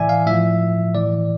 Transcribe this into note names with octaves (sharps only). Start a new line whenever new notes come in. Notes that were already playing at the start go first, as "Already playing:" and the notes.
Already playing: A2 E3 D5 E5 G#5
F5
A2 F3 E5
A2 E3 D5